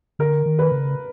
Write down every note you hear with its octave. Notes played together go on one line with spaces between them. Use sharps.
D3 A#4
D#3
B4
C#3